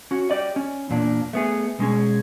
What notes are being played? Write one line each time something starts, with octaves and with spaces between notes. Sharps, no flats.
C#4 F#4
G4 D5 D#5
C#4
E2 A#2 D4
A3 B3 G#4
B2 G#3 C#4 G#4